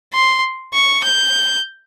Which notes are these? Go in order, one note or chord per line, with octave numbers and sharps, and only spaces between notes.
C6
C#6
G6